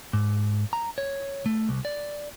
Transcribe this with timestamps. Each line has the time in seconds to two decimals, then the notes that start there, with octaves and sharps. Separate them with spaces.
0.13 G#2
0.73 A#5
0.98 C#5
1.46 A3
1.69 C2
1.85 D5